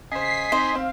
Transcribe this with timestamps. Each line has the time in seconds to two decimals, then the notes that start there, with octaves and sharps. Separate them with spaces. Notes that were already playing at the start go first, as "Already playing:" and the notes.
0.11 C#3 C5 D#5 G#5 B6 C7
0.52 C4 D#4 C5
0.75 C4 F5